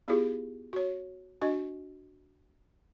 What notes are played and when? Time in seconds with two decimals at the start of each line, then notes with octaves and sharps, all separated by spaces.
0.08 B3 E4 F4 G4 G#4
0.73 F#4 C#5
1.41 D4 F#4 D#5